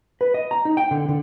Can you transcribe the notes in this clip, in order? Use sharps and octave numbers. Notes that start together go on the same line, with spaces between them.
B4
D#5
A#5
D#4
G5
D3
D3